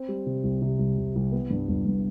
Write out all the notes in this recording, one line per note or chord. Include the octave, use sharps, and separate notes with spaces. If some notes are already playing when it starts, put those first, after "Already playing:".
Already playing: C4
G3
C3
C2
C3
C2
C2
C2
B3
G2
G1
G2